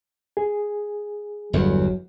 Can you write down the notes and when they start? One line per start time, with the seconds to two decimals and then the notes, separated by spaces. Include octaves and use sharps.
0.37 G#4
1.53 G1 E2 F#3